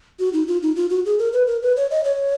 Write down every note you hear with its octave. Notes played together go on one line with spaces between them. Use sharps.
F#4
D#4
F4
D#4
F4
F#4
G#4
A#4
B4
A#4
B4
C#5
D#5
C#5